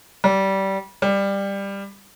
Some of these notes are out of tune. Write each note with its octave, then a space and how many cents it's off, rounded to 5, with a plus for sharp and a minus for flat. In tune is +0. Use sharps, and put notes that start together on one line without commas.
G3 -20
G3 +15